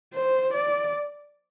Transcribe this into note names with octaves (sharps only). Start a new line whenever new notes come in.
C5
D5